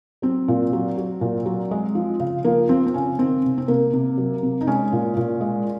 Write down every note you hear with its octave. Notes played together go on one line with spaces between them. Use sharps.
F#3 C4
A#2
F#3
F#3
A#2
F#3
G#3
F3
C#3
F3 A#3
F3 C4
C4
C#3 C#4
D#3 C4
C3
C4
C3 A#3
C3
F#3
C3
D#4
G#3 C#4
A#2
A#2
G#3